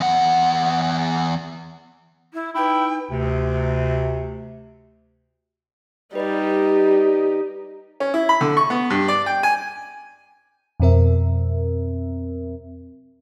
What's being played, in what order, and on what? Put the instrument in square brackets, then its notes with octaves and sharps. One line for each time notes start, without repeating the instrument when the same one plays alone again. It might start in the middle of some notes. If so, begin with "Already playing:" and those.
[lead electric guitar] E2 F#5
[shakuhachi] E4
[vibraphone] D#4 B4 [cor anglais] E4 [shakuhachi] G5
[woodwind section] D2 C3
[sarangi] G3 [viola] D#4 G4 [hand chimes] B4 D5 D#5
[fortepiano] C#4
E4
B5
D3
C#6
B3
G2
D5
G5
G#5
[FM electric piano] F2 B2 C4 A#4 E5